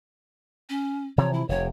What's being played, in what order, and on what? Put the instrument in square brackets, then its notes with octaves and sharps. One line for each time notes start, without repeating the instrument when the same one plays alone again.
[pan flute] C#4
[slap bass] C3 E3 F3 [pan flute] C#5
[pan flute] E4
[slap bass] F1 C3 [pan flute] C#5